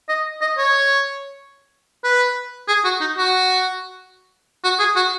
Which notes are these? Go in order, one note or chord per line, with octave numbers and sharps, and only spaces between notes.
D#5
D#5
C#5
B4
G#4
F#4
D#4
F#4
F#4
G#4
F#4